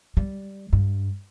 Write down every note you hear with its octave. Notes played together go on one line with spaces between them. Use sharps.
G3
G2